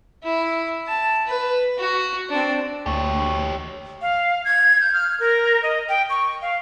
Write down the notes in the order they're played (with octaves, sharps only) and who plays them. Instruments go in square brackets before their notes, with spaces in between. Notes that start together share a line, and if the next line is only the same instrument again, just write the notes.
[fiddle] E4
A5
B4
F#4
C4 D4
[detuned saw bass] D2 [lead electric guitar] G4 C#5
[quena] F5
G#6
G6
F6
A#4
D#5
G5
C#6
F5